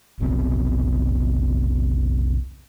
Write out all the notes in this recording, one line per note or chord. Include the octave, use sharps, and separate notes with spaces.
F1 B1 B2 C4